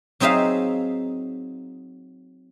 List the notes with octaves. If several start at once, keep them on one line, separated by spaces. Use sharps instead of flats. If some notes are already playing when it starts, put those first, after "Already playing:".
F#3 C4 D#4 G#4 E5 F5